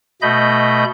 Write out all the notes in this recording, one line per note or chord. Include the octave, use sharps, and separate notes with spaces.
B2 A3 D#5 B5 G6